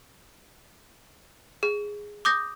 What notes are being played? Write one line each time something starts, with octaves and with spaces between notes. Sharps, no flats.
G#4
D6 D#6 G6 A#6